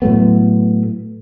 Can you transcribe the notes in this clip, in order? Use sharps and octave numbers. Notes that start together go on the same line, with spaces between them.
A2 F#3 A3 B3